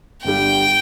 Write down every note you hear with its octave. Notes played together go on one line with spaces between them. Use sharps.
G1 G2 G3 G5